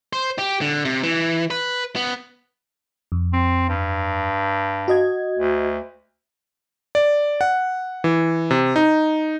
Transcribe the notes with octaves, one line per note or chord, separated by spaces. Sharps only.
C5
G4
D3
C3
E3
B4
B3
F2
C4
G2
F#4 D#5 G#6
D2
D5
F#5
E3
C3
D#4